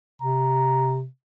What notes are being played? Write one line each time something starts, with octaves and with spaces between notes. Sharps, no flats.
C3 A#5